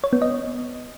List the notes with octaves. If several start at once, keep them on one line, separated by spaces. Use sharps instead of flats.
C#5
B3
D#5